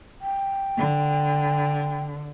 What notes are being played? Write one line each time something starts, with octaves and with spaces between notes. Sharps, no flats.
G5
D3